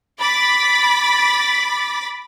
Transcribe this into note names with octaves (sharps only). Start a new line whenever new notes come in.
B5 D6 A6 B6